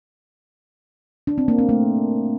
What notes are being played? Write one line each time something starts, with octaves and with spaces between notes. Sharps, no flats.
D4
C4
A#3
C4
A3